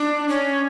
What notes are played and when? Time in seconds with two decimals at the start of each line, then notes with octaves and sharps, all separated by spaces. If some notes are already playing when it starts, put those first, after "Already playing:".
Already playing: D4
0.29 C#4